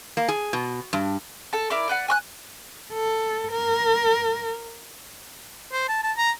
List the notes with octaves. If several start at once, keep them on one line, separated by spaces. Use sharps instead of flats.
A#3
G#4
B2
G2
A4 A5
E4 A#4 D5 D6
B4 D5 F#5
G#5 C#6 F#6
A4
A#4
C5
A5
A5
A#5